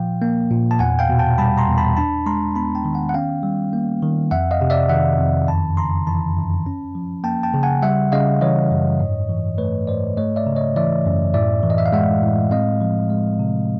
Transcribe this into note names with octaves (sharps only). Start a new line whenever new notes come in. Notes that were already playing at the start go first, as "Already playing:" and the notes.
Already playing: A#2 F3 F5 G5
A#3
A#2
A5
E2 F#5 G#5
F5 G5
B2
G5 A5
G3 A5 B5
A#5 C6
E2
A5 B5
D4 A5 B5
G#3 A#5 C6
B3 A5 B5
G5 A5
D#3
F#5 G#5
F#5
C#4 F5 G5
G3
A#3
D#3
F2 E5 F#5
D#5 F5
C3
D5 E5
D#3 E5 F#5
F2
F#2 A5 B5
C#3 A#5 C6
E3 A5 B5
F#2
C#4
F3
A#3 G5 A5
G5 A5
C#3
F#5 G#5
G3 E5 F#5
C#3 D#5 F5
E3 C#5 D#5
F#2
G#2
E3
A3 B4 C#5
G#2 C5 D5
A3 C#5 D#5
D5 E5
C#3
C#5 D#5
E3 D5 E5
F#2
A2 D5 E5
E3
D#5
E5
F5
G#3 E5 F#5
A2
C4 D#5 F5
F3
G#3
C3